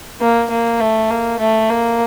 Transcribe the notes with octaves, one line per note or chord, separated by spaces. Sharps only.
A#3
A#3
A3
A#3
A3
A#3